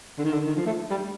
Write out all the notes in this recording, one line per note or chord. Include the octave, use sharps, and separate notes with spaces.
D3
D#3
D3
D#3
F3
A3
G3